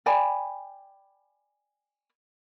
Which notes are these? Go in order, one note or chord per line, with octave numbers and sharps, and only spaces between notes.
D5 G5 G#5 B5